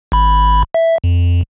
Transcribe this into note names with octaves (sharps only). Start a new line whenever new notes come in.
G#1 B5
E5
F2